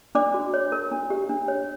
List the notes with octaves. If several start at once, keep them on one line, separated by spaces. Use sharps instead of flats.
D4 D5 D6
F#4
C#5
A#4
D4
G4
D4
C#5